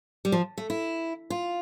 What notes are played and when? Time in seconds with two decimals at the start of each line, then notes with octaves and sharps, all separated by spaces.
0.25 G3
0.32 F3
0.58 A3
0.70 E4
1.30 F4